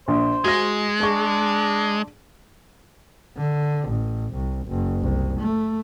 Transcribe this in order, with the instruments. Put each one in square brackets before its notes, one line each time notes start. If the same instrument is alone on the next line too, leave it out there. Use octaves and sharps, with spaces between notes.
[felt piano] A#1 [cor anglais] C5
[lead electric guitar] G#3 [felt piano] F#4 A#6
[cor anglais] D4 [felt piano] G#4 C#6
[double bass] D3
A1
C2
F#1
C2
A3